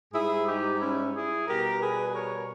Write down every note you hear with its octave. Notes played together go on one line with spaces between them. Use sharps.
G#2 G3 E4 G#4
D#4 G4
C#4 E4
E4 G#4
B2 G3 G4 A#4
G#4 B4
A#4 C#5